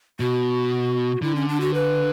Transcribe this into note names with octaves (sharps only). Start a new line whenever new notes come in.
B2 F#4
D3 E4
C#4
D4
F#4
B4